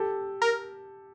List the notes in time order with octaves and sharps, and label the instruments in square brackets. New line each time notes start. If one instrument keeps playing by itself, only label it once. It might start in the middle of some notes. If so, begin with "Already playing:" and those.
Already playing: [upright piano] G4 A4
[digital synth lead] A#4